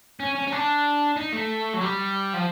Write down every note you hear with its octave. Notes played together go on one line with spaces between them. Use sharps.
C#4
C#4
C#4
D4
D#4
A3
F#3
G3
F3